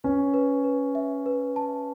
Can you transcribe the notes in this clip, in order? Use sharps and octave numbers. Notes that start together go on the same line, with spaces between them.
C#4 B4
B4
B4
E5
B4
A5